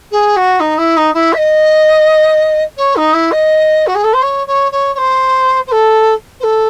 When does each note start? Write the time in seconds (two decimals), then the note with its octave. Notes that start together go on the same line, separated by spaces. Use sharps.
0.11 G#4
0.36 F#4
0.60 D#4
0.78 E4
0.96 D#4
1.14 E4
1.33 E5
1.37 D#5
2.77 C#5
2.96 D#4
3.13 E4
3.31 D#5
3.86 F#4
3.95 G#4
4.03 A4
4.13 C5
4.22 C#5
4.47 C#5
4.71 C#5
4.94 C#5
4.97 C5
5.67 C5
5.71 A4
6.40 C5
6.43 A4